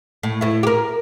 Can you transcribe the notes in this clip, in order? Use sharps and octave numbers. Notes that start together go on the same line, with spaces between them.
A2
A2 E4
G4 A#4